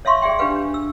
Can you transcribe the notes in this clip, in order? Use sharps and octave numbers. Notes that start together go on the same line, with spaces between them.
C#5 E5 F5 C6 C#6
G#4 D5 E5 G5 C6
D4 G4 B4 F5
D4
E6